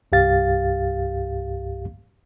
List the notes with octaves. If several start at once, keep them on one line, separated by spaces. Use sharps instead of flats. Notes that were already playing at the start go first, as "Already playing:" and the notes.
C2 G2 G4 F5 A6